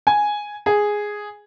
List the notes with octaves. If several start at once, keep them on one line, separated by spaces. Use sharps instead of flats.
G#5
G#4